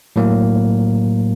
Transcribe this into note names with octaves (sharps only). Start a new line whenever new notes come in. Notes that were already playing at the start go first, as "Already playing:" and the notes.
A2 F#3 A#3